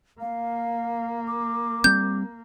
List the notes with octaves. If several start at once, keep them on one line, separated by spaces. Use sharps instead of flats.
A#3 F5
D6
G3 C4 G6